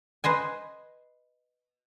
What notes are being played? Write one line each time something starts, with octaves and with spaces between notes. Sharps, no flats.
B4 C5 D#5 G#5